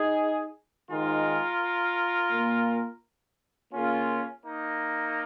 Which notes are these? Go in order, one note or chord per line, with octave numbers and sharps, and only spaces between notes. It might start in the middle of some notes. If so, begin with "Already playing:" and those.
Already playing: D#4 G#4
G#2 D#3 G#3 F4 A#4
A#2 A#3
C#3 A#3 C#4 F4
A#3 D#4